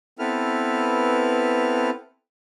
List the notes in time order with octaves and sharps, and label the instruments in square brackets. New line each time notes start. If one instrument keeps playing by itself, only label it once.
[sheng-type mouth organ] B3 C4 E4 A4 B4 F6